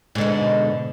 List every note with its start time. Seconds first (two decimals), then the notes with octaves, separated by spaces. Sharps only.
0.15 G#2
0.18 D3
0.21 B2